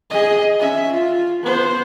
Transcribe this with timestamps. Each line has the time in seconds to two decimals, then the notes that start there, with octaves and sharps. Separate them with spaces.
0.11 G#4 D#5
0.60 C#4 E5
0.91 F4
1.43 B3 C5